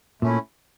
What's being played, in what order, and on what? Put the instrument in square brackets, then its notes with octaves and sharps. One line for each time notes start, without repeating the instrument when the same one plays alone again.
[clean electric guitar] A#2 [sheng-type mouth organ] A3 C#4 E4